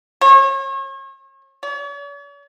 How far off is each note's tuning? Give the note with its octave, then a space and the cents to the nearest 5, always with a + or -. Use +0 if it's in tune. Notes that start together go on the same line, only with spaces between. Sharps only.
C#5 -40
C#5 +45